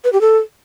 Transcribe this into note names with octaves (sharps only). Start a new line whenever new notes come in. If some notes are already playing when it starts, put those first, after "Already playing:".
B4
G4
A4